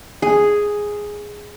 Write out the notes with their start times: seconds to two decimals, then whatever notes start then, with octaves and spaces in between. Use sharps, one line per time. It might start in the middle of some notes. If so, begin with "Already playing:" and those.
0.22 G#4